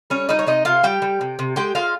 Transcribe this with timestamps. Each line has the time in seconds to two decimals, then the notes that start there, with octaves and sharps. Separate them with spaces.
0.10 G3 C#4 C#5
0.29 G3 D#4 D#5
0.39 C#5
0.47 C3 D#4 D#5
0.65 C3 F4 F5
0.83 G3 G4 G5
1.02 G3
1.21 C3
1.39 C3
1.56 G#3 G4 G5
1.75 G#3 F4 F5